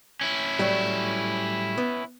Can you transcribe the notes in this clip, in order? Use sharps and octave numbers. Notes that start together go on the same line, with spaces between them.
C#4 E4
A2 F#3 G3
B3